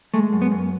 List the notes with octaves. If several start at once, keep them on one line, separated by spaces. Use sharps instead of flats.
G#3 A3
F#2
B3
F#2